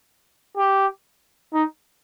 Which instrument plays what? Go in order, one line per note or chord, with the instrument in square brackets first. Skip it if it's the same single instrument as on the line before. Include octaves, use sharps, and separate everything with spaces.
[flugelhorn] G4
D#4